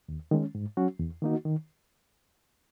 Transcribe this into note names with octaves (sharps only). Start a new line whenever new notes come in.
D#2
D#3 G#3 C#4
G#2
F#3 C#4 F#4
E2
D#3 A#3 D#4 F#4
D#3